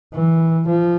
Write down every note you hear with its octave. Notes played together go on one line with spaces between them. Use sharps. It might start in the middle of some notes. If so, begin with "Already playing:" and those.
E3
F3